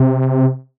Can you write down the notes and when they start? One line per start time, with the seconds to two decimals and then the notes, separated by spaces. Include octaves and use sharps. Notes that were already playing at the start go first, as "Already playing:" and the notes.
Already playing: C3